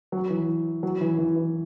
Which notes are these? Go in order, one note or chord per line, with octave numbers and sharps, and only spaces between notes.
F#3
E3
F#3
E3
E3
E3